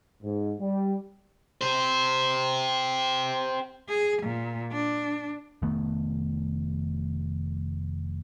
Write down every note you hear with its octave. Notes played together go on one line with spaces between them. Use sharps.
G#2
G3
G4 C5
G#4
A#2
D4
F1 D#3 A3 B3